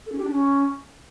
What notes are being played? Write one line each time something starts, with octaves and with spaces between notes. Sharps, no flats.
A4
C#4
G4
D4
C#4